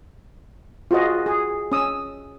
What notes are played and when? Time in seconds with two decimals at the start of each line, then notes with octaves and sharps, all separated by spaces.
0.91 F4 F#4 G#4 D#5
1.26 G#4
1.72 C#4 D#6 E6